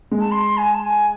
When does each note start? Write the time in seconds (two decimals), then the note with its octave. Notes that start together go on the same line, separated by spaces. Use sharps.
0.11 G#3
0.19 A5
0.31 C6
0.57 G#5
0.74 A5
0.84 G#5